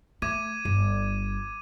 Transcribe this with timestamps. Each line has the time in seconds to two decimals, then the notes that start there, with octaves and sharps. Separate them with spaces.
0.22 A3 D6 G#6 D#7
0.65 G1